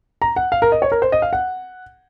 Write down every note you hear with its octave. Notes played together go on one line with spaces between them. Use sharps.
A#5
F#5
F5
A#4
D#5
C#5
A#4
C5
D#5
F5
F#5